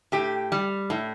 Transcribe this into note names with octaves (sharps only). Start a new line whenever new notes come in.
A2 G4
G3
A2